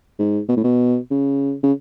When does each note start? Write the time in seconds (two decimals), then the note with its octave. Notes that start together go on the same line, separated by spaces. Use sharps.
0.19 G#2
0.49 B2
0.57 A2
0.64 B2
1.11 C#3
1.63 C#3